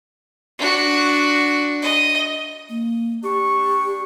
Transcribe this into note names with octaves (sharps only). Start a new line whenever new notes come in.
D4 F#4
D#5
A#3
D4 G4 C#6